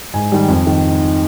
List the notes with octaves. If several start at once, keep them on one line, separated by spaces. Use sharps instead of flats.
G#2 G#5
D#3 G3
F2
D#3